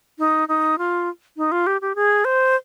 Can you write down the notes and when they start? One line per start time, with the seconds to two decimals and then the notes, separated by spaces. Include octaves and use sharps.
0.19 D#4
0.48 D#4
0.78 F4
1.37 D#4
1.52 F4
1.67 G4
1.81 G4
1.96 G#4
2.25 C5